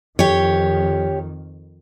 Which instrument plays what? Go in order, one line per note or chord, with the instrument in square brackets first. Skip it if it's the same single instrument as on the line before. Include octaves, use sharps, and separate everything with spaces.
[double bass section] F2 D#3 [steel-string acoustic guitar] G4 C#5